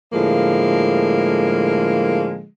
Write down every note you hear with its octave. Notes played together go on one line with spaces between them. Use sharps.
A2 D3 F3 G#3 A#3